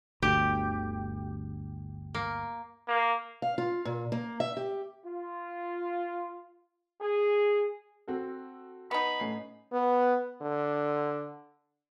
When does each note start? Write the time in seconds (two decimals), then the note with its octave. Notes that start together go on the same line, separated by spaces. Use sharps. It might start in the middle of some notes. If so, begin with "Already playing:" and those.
0.23 G1 D2 G4
2.14 A#3
2.88 A#3
3.42 F5
3.58 F4
3.85 A#2
4.12 A#3
4.40 E5
4.57 G4
5.04 F4
7.00 G#4
8.08 C4 F#4 A4
8.91 B3 D#4 B5
9.20 A2 C#4 C7
9.73 B3
10.42 D3